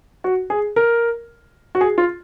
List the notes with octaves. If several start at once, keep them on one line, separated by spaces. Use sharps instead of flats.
F#4
G#4
A#4
F#4
G#4
F4